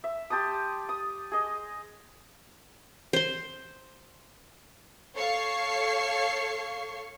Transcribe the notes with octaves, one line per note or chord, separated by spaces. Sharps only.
E5
G4 A5 C6 D#6
D#6
G#4 D#5
C5 C6
A4 C#5 F5 C#6 C7